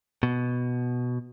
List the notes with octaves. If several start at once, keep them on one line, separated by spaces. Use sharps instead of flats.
B2